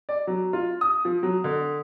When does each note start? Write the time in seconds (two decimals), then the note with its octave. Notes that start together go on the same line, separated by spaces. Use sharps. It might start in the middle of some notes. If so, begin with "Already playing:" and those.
0.09 D5
0.27 F#3
0.53 F4
0.81 D#6
1.05 F3
1.23 F#3
1.44 D3